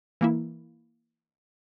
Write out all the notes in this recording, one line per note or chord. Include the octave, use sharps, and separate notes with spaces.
E3 A#3 E4